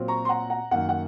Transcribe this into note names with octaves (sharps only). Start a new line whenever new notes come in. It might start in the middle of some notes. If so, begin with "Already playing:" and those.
Already playing: A#2 F#3 C4
A#5 C#6
C6
F#5 A#5
F#5 A#5
F#2 D#3 A#3 F#5
F#5